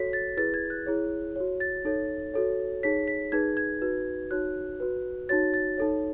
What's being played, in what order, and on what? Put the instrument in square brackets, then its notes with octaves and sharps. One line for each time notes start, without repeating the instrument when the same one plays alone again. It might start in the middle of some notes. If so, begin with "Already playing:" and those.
Already playing: [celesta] F#4 A4 C#5 B6
A6
E4 G#4 B4 A6
G#6
F#6
E4 G#4 C#5
F#4 C#5
A6
D#4 A4 C#5
F#4 A4 C#5
D#4 G#4 C#5 B6
B6
D#4 G#4 B4 G#6
G#6
D#4 F#4 B4
D#4 F#4 C#5 F#6
F#4 B4
D#4 F#4 C#5 A6
A6
D#4 A4 C#5